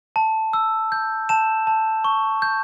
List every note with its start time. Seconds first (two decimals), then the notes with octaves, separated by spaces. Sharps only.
0.16 A5
0.53 E6
0.92 G6
1.29 A5 E7
1.67 A5
2.04 C#6
2.42 G6